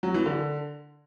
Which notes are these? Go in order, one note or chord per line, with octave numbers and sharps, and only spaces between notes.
F#3
E3
D3